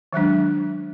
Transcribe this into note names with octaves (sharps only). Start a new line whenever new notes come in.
D#3 F#3 G#3 D4